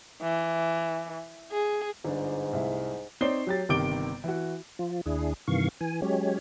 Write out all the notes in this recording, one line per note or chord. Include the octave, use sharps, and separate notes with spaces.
E3
G#4
G1 G#2 D4
C2 A3 E4
C4 D#4 C#5 D5 C7 G7
F#3 G4 A6
G1 C3 D#3 D6 D7 G7
E3 F#4
F3 F4
D#2 D4 E4 G#4
G2 C3 D#3 E3 F5 C#6
E3 G#5
F#3 G#3 C#4 G4 C#5